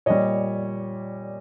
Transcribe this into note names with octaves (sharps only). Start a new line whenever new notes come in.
A#2 G3 C#5 D#5